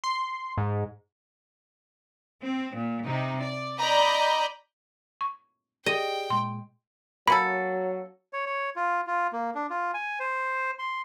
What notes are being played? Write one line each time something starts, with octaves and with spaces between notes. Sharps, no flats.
C6
G#2
C4
A#2
C3 D#4
D5
D5 D#5 A#5 B5 G6
C#6
G4 G#4 D5 D#5 G5
A#2 G#3 C6
F#3 A#3 C#4 A4 B5
C#5
C#5
F4
F4
A#3
D4
F4
G#5
C5
C6